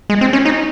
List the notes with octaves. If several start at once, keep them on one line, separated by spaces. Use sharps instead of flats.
G#3
C4
C#4
D#4